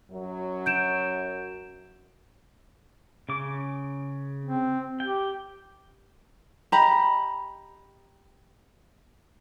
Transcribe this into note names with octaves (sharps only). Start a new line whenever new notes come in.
F#2 F#3
G6 D7 E7
C#3 D6
C4
G4 G5
G4 D#5 A#5 B5